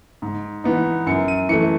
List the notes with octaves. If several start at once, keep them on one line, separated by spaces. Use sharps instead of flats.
G#2
E3 B3 D#4
F#2 C#7
D#7
E3 A3 C#7